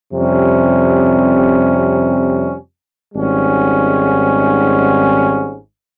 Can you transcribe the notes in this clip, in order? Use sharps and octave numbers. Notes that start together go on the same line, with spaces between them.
F2 C3 G3 C#4
G#1 G#2 G3 C#4